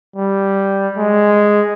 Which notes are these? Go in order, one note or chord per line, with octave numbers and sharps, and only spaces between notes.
G3
G#3